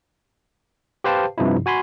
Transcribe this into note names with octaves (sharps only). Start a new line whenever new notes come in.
G4 B4 C5 F5 G5 A5
G2 C3 F3 D#4 E4
F#4 G#5 B5 C6